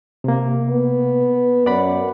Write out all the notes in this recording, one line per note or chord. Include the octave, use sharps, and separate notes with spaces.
C3 A#3
B3
F#2 D5 F#5 B5